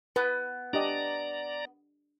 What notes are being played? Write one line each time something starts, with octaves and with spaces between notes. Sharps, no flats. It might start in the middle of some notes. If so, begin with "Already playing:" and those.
B3 B4
D4 G4 D5 D#5 A#5